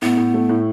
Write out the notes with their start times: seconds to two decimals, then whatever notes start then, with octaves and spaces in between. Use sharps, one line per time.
0.02 A2 B3
0.18 A2
0.34 A3
0.49 A2